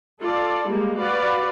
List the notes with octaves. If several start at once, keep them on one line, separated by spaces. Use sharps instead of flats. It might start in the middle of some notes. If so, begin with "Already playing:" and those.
F4 A4 D5
G3 G#3 A#3
F#4 B4 D5 F5